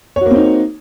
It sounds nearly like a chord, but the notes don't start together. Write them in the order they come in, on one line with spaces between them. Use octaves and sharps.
C#5 F#4 A#3 C4 D#4